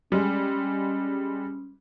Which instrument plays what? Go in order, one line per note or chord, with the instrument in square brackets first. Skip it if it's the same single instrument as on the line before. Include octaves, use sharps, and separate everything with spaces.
[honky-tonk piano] G3 G#3 [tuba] C#4